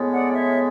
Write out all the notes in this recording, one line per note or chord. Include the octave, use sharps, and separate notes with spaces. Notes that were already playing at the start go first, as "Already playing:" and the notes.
Already playing: A2 G#3 B3
D5 F#5
C#5 E5